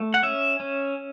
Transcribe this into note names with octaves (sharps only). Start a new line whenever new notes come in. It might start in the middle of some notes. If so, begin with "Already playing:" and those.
Already playing: A3
F#5
C#4 E5
C#4